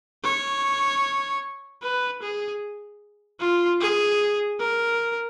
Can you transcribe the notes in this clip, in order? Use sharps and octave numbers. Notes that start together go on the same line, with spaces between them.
C#5
B4
G#4
F4
G#4
A#4